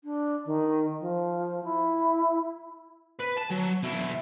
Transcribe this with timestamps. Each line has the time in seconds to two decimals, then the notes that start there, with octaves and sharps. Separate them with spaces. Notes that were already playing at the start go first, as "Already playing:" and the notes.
0.04 D4
0.46 D#3
1.00 F3
1.64 E4
3.20 B4
3.38 A5
3.51 F#3
3.83 B2 E4